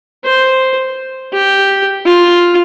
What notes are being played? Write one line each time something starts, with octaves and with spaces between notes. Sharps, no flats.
C5
G4
F4